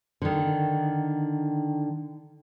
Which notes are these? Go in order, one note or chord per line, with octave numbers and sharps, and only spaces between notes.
D3 D#3